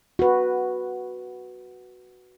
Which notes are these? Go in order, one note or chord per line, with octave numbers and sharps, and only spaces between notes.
F#4 B4